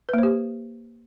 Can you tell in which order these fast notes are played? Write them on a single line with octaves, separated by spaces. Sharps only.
B4 A#3 C5 G4